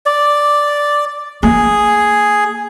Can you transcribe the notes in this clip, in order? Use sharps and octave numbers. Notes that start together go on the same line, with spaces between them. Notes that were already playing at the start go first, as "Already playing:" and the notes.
D5
A#3 G#4